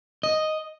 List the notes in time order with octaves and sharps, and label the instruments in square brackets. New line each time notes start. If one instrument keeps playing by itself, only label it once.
[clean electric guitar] D#5